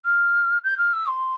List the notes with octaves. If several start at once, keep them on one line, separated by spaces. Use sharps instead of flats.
F6
G6
F6
E6
C6